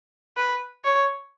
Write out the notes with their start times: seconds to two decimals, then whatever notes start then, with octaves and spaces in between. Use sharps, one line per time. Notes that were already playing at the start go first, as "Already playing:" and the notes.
0.37 B4
0.85 C#5